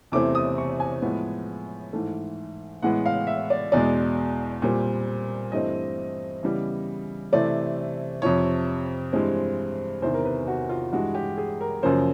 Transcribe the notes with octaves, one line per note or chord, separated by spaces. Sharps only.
E2 C3 E3 A3 C4 D6
D#6
C#6
G#5
A2 F3 G#3 B3
G#2 E3 A3
A2 E3 G#3 B3 F#5
F5
E5
D5
E2 B2 G#3 D5
A#2 G3 C4
G2 E3 A3 C4 D#5
C#3 E3 G3 B3
C3 E3 A3 C4 D5
F2 C3 F3 C#5
G2 E3 G#3 C4
E2 C3 D#3 C5
A#4
B4
F#4
F4
G2 E3 G#3 F#4
G4
G#4
A#4
F#2 C#3 F3 A#3 C5